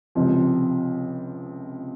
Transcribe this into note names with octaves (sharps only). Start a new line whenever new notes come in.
C#2 C3 F3